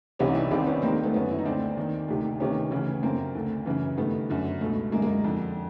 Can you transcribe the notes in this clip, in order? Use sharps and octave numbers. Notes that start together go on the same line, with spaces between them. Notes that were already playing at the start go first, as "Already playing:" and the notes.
C2 C3 E3 C#4 D#4
D4 E4
C2 C3 D#3 C4 D4
B3 C#4
D#2 D#3 A#3 C4
A3
A3 B3
F#2 D3 B3 C#4
E4
D#4
D2 D3 C4 D4
D#2 D#3
D2 C3 D#3
D2 C3 D#3 B3 C#4
D2 C#3 E3
F#2 D3 A#3 C4
D2 D3
F#2 C#3 E3
G2 D#3 A3 B3
F#2 D3
C#2 B2 A3
F#2 D3 G#3 A#3
G#3 A#3
F2 D3